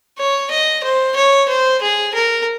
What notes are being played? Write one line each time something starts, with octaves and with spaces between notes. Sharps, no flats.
C#5
D#5
C5
C#5
C5
G#4
A#4